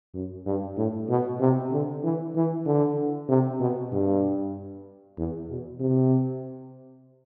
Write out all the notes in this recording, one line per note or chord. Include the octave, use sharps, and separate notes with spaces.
F#2
G2
A2
B2
C3
D3
E3
E3
D3
C3
B2
G2
E2
B2
C3